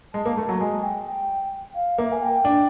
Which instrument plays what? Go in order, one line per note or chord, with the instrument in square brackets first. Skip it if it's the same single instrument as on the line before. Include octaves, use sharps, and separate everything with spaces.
[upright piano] G#3 [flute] A5
[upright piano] A#3
A3
F#3
[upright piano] G#3 [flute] G#5
[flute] G5
G5
F5
[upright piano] A#3 [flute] E5
[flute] G#5
G5
[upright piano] D4